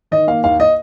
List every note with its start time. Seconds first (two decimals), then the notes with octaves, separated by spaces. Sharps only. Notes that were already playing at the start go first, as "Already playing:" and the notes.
0.11 D#3 D#5
0.27 A#3 F5
0.44 D#2 F5
0.60 D#5